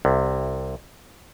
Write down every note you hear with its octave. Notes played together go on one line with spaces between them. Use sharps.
C2 C3